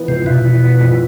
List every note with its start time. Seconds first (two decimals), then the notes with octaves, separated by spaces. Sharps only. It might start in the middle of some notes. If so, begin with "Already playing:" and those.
Already playing: E3 B3 E4
0.08 F2 C3
0.26 B2 E4
0.45 E3
0.63 B3
0.81 F2